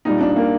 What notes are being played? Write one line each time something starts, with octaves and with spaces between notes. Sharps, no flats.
A#2 G3 D#4
D4
A#3